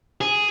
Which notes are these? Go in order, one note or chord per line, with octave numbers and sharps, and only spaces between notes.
G#4